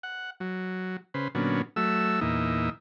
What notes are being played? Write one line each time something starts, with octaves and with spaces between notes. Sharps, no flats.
F#5
F#3
C#3 B4 C5
A#2 D3 F#3 B3 C#4
F#3 A3 E5 E6
E2 A#2 D#4 E5